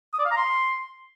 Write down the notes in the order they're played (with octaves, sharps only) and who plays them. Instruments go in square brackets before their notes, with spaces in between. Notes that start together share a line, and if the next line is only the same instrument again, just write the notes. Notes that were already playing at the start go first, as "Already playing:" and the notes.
[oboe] D#6
D5
F5
A#5
C6